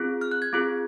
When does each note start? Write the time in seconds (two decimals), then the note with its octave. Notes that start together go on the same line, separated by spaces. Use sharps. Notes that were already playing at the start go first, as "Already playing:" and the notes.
Already playing: C4 F4 G#4
0.21 F6
0.31 F#6
0.42 G#6
0.53 C4 F4 G#4